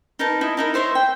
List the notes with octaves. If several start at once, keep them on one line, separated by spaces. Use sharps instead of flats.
D#4 A#4 B4 A5
E4 D#5
D#4 E4 A#4
D#4 C5 C#5 E5
G5